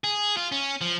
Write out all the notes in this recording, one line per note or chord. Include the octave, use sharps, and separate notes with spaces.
G#4
F4
C#4
F3